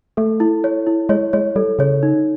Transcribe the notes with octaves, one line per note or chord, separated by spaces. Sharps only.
A3 A4
E4
C#5
E4
G#3 C#5
G#3 C#5
G3 A4
C#3 C#5
D#4